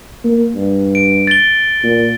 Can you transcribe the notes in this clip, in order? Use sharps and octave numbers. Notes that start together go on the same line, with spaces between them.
A#3
G2
D7
A6 G7
A#2